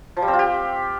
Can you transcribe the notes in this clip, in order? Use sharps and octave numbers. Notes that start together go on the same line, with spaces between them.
F3
G3
C4
F4
G4